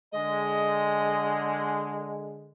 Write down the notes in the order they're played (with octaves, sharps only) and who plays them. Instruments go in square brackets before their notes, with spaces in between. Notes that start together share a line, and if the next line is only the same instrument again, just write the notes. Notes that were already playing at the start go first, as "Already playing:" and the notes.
[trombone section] D3 G#3 [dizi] D#5